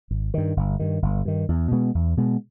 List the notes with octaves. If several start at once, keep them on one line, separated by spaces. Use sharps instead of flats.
G#1
G2 D#3
G1
G2 D#3
G1
G2 D#3
E2
B2 G#3 B3
E2
B2 G#3 B3